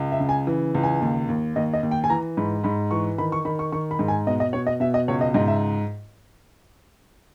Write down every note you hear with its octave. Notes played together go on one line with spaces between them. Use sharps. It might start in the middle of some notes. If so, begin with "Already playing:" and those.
Already playing: C#2
E5
C#3
G#5
E3
C#2
G#5
D#2
D#2
D#2 D#5
D#5
D#2
G5
G#5
E3 A#5
G#2 B5
G#2 B5
E3 C#6
D#3 B5
C#6
D#3 B5
C#6
D#3 C#6
B5
G#2
G#5
B2 D#5
D#5
B2 C#5
D#5
B2 E5
D#5
C#2 C#5
D#5
G#2 D#5
E5